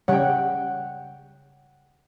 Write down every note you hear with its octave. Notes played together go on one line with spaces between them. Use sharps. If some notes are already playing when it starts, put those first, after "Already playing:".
C#3 G3 C#5 F#5 G5